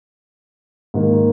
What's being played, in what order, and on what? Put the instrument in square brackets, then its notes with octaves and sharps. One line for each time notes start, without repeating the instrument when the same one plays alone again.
[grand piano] G#2 D#3 A#3